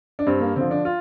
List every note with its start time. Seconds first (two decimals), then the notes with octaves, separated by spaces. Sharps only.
0.19 D4
0.26 G2 C4
0.41 A#3
0.56 D3 F3 C4
0.71 D4
0.85 F4